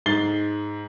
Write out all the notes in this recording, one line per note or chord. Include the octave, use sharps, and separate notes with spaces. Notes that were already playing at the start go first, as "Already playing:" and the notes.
G#2 A6 C7 G7